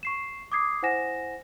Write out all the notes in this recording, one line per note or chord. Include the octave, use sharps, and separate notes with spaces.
C#6 C7 E7
D6 D#6 G#6 C7
E4 C5 F#5 G#5 A#6 E7